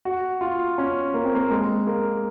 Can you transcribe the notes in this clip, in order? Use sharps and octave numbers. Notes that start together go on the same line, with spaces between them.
F#4
F4
C#4
A#3
C4
A#3
G#3
A#3